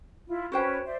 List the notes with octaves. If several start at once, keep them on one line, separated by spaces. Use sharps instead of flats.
E4 F4
C#4 F#4 B4 C5 G5
C5 D5 E5